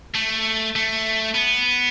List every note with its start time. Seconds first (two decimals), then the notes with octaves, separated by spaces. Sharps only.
0.15 A3
0.76 A3
1.35 B3